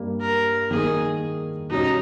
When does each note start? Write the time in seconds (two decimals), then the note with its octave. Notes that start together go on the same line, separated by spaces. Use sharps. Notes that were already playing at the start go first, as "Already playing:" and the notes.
Already playing: G2 G3 A#3
0.21 A#4
0.71 D#3 A#3 D#4 G#4
1.70 B2 G3 C#4 D#4